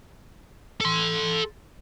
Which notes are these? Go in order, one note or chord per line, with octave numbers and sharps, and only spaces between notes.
A4 C6